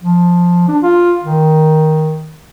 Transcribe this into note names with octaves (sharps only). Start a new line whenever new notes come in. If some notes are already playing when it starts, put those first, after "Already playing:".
F3
D4
F4
D#3